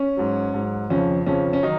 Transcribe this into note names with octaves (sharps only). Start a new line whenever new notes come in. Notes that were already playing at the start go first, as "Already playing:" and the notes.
Already playing: C#4
G#2 F#3
G#2 F#3
F2 C#3 F3 C#4
F2 C#3 F3 C#4
C#4
D#3 F#3 D#4